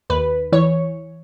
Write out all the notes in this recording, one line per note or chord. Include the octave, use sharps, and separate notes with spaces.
D#2 B4
E3 C#5